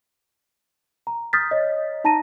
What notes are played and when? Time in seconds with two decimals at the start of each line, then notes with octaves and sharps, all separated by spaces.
1.07 A#5
1.33 D#6 F6 G6 A6 B6
1.51 C#5 D#5
2.04 D#4 A5 A#5 A#6 D#7